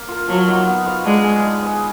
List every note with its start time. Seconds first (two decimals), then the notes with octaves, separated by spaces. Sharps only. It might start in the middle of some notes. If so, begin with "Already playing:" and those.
Already playing: A#3
0.08 F4 A#4
0.28 F3 F#3
0.47 A#3 D#4 F#4
0.66 B3
0.86 F4 B4 F5
1.05 G#3 D4
1.24 G#4 B4 F5
1.43 D#4
1.62 G#4 B4 D#5